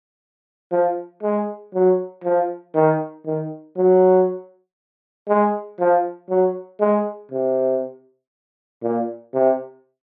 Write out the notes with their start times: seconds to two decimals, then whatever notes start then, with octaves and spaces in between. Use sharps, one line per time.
0.72 F3
1.23 G#3
1.74 F#3
2.24 F3
2.75 D#3
3.26 D#3
3.77 F#3
5.28 G#3
5.80 F3
6.29 F#3
6.80 G#3
7.32 C3
8.83 A#2
9.34 C3